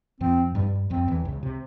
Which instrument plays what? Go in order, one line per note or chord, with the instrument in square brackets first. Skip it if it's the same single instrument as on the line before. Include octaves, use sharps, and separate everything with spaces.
[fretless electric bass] F2 F3 [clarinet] C4
[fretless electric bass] G2 G3
[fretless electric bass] F2 F3 [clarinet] C4
[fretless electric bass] E2 E3
C#2 C#3
C3